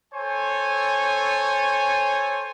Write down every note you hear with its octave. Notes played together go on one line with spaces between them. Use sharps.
A4 C5 C#5 G#5